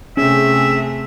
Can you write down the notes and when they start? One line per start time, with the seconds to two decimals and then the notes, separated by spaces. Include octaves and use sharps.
0.17 C3 A3 C#4 G#4 E5